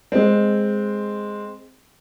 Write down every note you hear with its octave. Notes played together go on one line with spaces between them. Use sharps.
G#3 C4